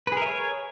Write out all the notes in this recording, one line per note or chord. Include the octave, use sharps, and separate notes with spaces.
G#4 A#4 B4 C#5 E5